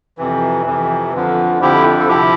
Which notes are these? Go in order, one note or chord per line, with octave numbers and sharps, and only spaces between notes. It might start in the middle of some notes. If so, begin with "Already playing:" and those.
F2 C3 E3
F2 C3 E3
F2 D3 F3
F2 D3 F3 E4 G4
A4
C3 F3 E4 G4